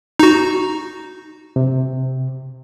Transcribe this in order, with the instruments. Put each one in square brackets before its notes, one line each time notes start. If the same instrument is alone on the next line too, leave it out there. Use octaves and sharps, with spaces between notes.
[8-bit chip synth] D#4 F#4
[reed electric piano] C3